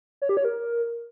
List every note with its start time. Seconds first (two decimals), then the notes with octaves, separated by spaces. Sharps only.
0.22 C#5
0.29 G4
0.37 C#5
0.45 A#4